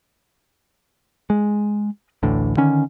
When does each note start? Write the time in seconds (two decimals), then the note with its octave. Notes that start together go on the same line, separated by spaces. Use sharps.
1.30 G#3
2.23 A1 D2 A2 D3
2.57 D3 D#3 C#4